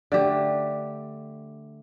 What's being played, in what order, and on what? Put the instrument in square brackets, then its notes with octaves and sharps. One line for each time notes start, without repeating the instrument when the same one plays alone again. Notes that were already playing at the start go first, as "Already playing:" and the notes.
[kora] D3 A3 G4